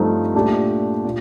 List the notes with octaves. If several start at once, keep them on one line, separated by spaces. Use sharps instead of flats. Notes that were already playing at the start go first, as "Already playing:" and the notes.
Already playing: G2 F3 A3 C4 D#4
A#2 A3 D4 G4
A#2